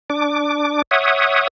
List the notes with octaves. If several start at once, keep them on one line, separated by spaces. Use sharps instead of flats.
D4 D6
C#5 E5 F#5 D#6